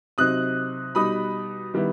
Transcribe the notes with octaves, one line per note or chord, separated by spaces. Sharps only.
C3 F#3 C4 D#4 D#6 F#6
B2 G3 D#4 B5 D#6
D#3 G3 B3 E4